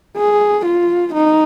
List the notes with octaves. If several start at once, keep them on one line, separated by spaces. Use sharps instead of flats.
G#4
F4
D#4